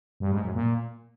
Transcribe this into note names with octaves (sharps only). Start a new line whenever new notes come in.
G2
G#2
F#2
A#2